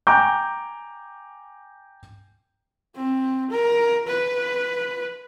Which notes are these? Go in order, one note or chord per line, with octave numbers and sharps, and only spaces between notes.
G5 G#5 A#5 D6 G6
C4
A#4
B4